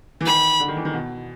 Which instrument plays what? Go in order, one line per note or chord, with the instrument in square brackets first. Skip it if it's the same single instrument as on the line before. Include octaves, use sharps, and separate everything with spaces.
[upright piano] E3
[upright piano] D#3 [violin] B5
[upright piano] D3
D#3
E3
D#3
B2